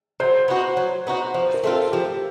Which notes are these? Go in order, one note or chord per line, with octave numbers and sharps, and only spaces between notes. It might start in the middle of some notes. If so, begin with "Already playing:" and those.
F#3 C5
B3 D#4 F#4
F#3
B3 D#4 F#4
F3 C5
A#4
A3 C4 F4
A4
F3 G4